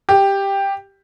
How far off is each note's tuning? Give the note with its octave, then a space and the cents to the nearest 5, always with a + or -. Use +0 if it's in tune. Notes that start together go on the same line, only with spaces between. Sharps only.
G4 +5